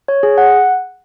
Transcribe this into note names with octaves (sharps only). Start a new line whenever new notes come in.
C#5
G#4
F#5